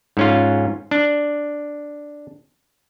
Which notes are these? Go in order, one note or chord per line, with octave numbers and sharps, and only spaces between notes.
G#2 C#4 F4
D4